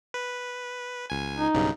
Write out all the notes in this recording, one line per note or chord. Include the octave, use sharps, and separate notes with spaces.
B4
C#2 G#5
D#4
B1 G2 C#3